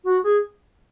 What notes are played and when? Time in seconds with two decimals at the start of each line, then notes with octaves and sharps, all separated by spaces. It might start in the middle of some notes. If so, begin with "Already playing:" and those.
0.04 F#4
0.24 G#4